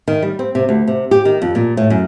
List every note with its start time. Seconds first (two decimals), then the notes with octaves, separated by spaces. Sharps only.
0.08 D#3
0.22 G3
0.39 C4
0.55 C3
0.69 D2
0.87 C3
1.11 G4
1.25 D#3
1.42 F2
1.55 A#2
1.77 A2
1.90 F#2